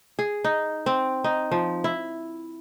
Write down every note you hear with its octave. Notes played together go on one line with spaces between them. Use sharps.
G#4
D#4
C4
D#4
F3
E4